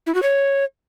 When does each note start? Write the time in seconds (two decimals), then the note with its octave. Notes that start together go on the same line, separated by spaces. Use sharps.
0.07 E4
0.15 F#4
0.23 C#5